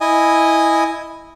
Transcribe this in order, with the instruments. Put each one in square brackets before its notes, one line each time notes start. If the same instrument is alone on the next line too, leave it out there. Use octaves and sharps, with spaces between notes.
[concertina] E4 D#5 G#5